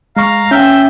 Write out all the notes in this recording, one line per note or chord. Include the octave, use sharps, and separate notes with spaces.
G#3 F5 A#5 C#6
C#4 E5 G5 G6